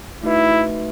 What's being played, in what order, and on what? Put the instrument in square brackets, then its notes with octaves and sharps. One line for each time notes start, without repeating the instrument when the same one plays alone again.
[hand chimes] A3 D#4 F#4 B4 E5 [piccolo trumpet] E4